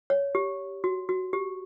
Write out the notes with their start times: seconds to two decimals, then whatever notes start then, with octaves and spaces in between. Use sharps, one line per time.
0.10 C#5
0.35 G4
0.84 F#4
1.09 F#4
1.33 G4